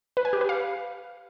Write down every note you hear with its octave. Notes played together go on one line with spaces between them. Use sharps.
B4
G#5
G4
B4
F5